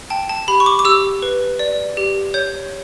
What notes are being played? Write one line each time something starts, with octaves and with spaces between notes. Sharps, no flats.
G5 A5
A5
G4 B5
C#6
D6
D6
G4 E6
B4
D5
G4
C#5 G6